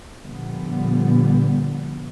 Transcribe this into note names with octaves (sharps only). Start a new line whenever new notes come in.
A#2 D3 F3 G3 B3